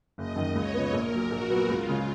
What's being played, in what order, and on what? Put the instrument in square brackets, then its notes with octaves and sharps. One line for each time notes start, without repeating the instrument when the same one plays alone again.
[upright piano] F#1 [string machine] D#5
[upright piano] F#2 D#3
[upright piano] C#2 [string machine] C#5
[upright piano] C#3 F3 B3
[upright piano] A#1 [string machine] A#4
[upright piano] A#2 F#3
[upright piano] A#1 [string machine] F#4
[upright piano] A#2 F#3 B3
[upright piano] C#2 [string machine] F4
[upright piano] C#3 G#3 C#4